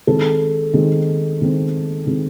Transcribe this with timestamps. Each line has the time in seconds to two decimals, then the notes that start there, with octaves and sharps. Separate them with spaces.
0.07 D#3 G#3 C4 A4
0.73 D#3 G#3 C4
1.41 D#3 G#3 C4
2.06 D#3 G#3 C4